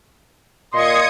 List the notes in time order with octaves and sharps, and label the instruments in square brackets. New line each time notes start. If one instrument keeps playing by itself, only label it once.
[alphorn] A#2 [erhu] D#5 [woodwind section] C6 [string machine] D#6 G#6 C#7